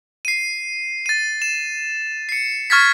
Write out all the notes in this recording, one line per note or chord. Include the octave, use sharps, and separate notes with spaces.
C7 D#7
A6 D#7
E7
C7 C#7
C#6 F6 G#6 A6 B6